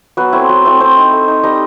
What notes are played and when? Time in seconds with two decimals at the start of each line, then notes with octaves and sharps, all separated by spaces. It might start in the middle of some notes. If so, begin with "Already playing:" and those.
0.17 F#3 B3 B4
0.32 A3 C4 E4
0.49 F#3
0.65 A3 C4 E4
0.80 A3 C4 C5
0.97 D#4
1.12 A3
1.28 D#4
1.43 G3 D#4 D#5